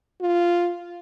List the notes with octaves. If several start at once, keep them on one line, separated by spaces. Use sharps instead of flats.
F4